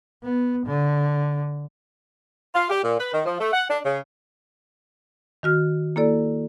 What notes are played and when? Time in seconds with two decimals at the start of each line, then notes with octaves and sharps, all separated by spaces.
0.23 B3
0.66 D3
2.55 F4
2.70 G4
2.84 A#2
2.99 B4
3.13 D#3
3.26 F3
3.40 A3
3.53 F#5
3.70 D4
3.84 C#3
5.43 D#3 F#4 F6
5.96 A#3 E4 A4 D5